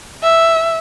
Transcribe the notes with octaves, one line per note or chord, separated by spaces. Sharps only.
E5